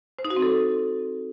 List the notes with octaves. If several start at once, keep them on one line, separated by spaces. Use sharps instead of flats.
C5
D#4
F#4
C4
A4